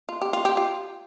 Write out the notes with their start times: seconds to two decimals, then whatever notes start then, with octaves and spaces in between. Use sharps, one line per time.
0.09 F4
0.22 G4
0.33 F4
0.45 G4
0.57 F4